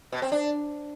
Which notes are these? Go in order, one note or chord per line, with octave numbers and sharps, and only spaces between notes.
B2
C4
D4